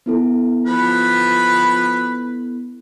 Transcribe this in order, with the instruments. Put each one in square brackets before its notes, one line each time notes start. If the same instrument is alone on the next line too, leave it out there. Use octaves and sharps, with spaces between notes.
[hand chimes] B3 E4 A4
[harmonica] F3 B4 B5